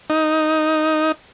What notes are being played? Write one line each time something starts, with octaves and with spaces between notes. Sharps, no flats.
D#4